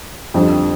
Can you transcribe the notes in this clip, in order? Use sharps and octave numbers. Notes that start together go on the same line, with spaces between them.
F2 D3 G3